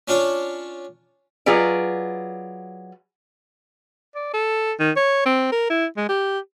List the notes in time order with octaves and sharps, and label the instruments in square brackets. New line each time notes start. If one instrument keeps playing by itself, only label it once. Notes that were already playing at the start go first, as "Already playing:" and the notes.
[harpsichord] C#4 D4 F4 C#5
[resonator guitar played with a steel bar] F#3 F4 G#4 B4 D5
[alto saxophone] D5
A4
D#3
C#5
C4
A#4
E4
G#3
G4